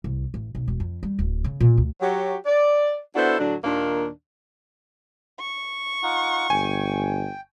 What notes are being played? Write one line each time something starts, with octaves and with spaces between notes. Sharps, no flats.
C2
A1
B1
E1
F2
G3
D1
C#3
A#2
D2
F#3 F#4 G4
D5
B3 D4 E4 F#4 A4 C5
A2 D3 F#3 D4
D#2 A#2 D#3 A#3 D4
C#6
D#4 F4 F#5
G1 G5 G#5